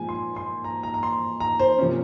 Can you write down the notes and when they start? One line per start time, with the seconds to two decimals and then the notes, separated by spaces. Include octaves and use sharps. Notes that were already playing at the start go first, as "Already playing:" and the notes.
Already playing: A#2 F3 G#3 G#5
0.09 C6
0.36 C6
0.64 A#5
0.83 A#5
0.94 A#5
1.03 C6
1.40 A#5
1.59 C5
1.78 C3 F3 A#3 C#4